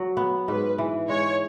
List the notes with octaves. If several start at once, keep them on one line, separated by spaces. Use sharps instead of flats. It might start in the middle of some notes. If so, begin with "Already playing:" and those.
Already playing: F#3
B3
G#2 B4
E3
G#3 C#5